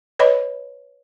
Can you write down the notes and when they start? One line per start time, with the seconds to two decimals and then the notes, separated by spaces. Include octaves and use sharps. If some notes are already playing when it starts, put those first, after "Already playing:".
0.19 B4 C#5 D#5 B5